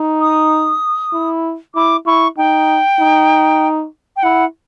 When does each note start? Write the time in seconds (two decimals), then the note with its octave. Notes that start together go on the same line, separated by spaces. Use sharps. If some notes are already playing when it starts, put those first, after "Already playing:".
Already playing: D#4
0.21 D#6
1.13 E4
1.75 E4 D6
2.06 E4 C#6
2.37 D#4 G5
2.99 D#4
4.16 G5
4.23 E4 F#5